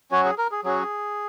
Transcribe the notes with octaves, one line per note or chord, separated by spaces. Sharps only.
F#3 C#4 F#4 C#5
G#4
A#4
G#4
F#3 C#4 F#4 G#4